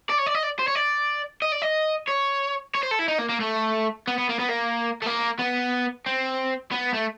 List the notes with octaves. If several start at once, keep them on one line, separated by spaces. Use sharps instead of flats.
D5
C#5
D5
D#5
D5
C5
C#5
D5
D#5
D5
D#5
C#5
C#5
C5
A4
E4
D#4
A#3
A#3
A3
B3
B3
A#3
B3
A#3
A3
A#3
B3
C4
B3
A3